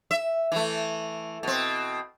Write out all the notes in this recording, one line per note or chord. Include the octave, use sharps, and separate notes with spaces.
E5
E3 A3
B2 C4